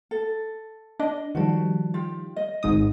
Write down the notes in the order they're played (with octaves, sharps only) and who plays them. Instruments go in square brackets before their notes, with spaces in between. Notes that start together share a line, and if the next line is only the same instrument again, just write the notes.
[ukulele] A4
[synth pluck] D4 [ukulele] D#5
[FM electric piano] D#3 F3 G3 [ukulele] F#4 A5
[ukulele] F4 G4
D#5
[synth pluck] G#1 G#2 D#6